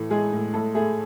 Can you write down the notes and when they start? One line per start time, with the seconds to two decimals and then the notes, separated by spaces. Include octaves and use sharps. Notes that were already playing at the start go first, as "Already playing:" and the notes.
Already playing: A2 E3 A4
0.10 G#3 G#4
0.32 A2
0.54 A2 A4
0.75 A3 G#4